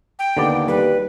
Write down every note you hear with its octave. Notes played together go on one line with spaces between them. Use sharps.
G5
D#2 D3 B3 D5
G3 B4